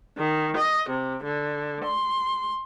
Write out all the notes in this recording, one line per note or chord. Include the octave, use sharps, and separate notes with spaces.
D#3
D#5
C3
D3
C6